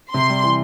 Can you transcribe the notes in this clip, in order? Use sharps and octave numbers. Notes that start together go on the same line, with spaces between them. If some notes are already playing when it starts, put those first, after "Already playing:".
C3 C6
G3
E3